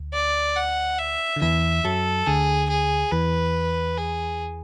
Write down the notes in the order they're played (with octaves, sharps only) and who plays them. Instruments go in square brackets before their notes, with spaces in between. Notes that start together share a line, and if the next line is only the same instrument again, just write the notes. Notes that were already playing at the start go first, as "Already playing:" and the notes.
Already playing: [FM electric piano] D2
[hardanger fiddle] D5
F#5
E5
[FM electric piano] D3
[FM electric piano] E2 E3 [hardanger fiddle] E5
[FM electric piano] F#2 F#3 [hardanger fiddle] A4
[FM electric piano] D2 D3 [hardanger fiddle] G#4
[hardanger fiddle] G#4
[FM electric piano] E2 E3 [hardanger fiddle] B4
[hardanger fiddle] G#4